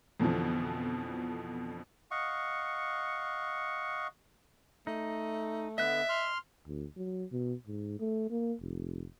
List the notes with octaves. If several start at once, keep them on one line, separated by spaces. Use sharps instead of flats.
F2 B2 D3 E3 F3
D#5 F5 F#5 C#6
A3 D#4
D3 B3 D#5 E5 F#6
C6 F6
D2
F#3
B2
G#2
A3
A#3
F1